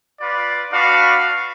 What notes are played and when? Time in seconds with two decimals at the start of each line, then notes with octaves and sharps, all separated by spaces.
0.19 F4 B4 D5
0.73 D4 F#4 B4 F5